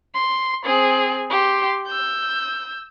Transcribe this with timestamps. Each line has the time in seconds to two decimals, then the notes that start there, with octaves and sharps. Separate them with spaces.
0.14 C6
0.64 C4 G#4
1.30 G4 C6
1.86 E6 G6